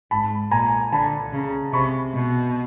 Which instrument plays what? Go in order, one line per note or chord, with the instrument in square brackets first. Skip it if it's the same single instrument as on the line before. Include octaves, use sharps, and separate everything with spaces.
[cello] G#2 [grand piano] A5 B5
[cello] A#2 [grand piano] G#5 A#5
[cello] D3 [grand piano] A5 B5
[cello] C#3
[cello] C3 [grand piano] B5 C#6
[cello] B2